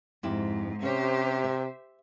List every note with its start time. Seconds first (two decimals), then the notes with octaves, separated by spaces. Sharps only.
0.23 F2 G#2 E4 G4
0.83 C3 C#4 G4 C5 C#5
1.44 E5